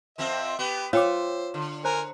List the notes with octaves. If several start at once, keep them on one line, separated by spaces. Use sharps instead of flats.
F2 F3 C4 E5
B3 G4 C6
F4 C5 C#5 E5 G5 D6
D3
A#4 C5 G#5 A#5